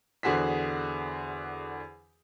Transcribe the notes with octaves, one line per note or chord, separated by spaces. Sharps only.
E2 D3 F#4 G#4 C5 B6